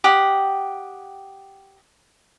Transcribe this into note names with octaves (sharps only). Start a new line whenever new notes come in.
G4 D#5 F#5 G5